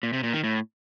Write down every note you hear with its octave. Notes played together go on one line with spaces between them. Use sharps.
A#2
C3
A#2
D#3
A2